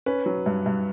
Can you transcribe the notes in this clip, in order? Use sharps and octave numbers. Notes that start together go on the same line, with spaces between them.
C#4 B4
F#3
G2
G2